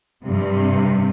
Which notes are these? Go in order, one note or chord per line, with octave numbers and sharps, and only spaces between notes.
G2 C3